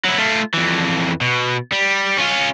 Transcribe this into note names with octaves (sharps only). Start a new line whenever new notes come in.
F#3 E4
A3 F4
F2 E3
B2
G3
C#4 F4